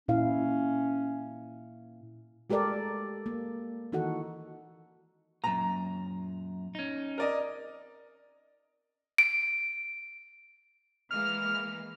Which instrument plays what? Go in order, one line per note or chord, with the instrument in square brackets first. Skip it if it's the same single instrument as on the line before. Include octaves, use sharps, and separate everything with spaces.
[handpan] A#2 E4 F5 [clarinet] C#4
[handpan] G#3 G4 A4 A#4 D5
A#3
D#3 E3 D#4 F#4 A4 F#5
[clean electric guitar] F#2 A#2 [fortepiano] A#5
[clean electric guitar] C#4 D#4
[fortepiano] A#4 D5 D#5
[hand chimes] D7
[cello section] E3 G#3 A#3 [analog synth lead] F6